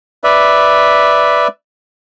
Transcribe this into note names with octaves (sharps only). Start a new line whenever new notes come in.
B4 D5 E5